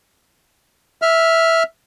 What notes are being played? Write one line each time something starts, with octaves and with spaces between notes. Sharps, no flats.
E5 F6